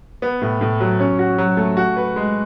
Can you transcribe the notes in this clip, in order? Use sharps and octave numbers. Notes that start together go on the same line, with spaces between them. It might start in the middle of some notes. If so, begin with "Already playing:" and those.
B3
A2
A2
F#3
C#4
F#4
F#3
A3
F#4
B4
G#3